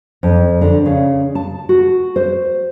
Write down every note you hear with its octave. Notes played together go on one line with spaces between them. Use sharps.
F2
D3
C#3
A5
F#4
C5